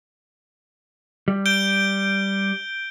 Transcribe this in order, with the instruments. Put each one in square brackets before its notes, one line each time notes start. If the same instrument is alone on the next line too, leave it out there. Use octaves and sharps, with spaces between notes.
[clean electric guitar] G3
[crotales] G6 D7 G7